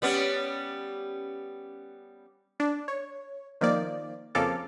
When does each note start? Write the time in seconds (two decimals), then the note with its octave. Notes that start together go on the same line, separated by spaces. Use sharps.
0.02 G3 B3 C#4
2.60 D4
2.88 C#5
3.61 D#3 F3 A#3 D5
4.35 F2 C#3 A#3 A4 D6 F6